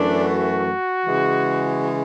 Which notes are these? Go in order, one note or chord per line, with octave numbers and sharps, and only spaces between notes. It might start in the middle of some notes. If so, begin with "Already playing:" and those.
Already playing: F#2 E3 A3 D4
F#4
C#3 E3 G#3